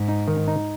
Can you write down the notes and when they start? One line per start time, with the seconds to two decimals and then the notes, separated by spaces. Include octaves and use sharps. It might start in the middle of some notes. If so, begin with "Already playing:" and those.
Already playing: G#2
0.09 D#4
0.28 D#3
0.48 D#4